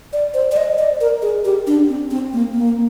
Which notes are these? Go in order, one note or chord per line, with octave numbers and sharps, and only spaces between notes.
D5
C5
D5
D#5
D5
A#4
G#4
G4
D4
C4
C4
A#3
A#3